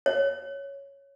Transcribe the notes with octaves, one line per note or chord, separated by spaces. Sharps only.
C#5